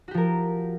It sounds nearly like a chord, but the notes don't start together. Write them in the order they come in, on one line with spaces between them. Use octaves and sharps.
F#4 G4 F3 A#4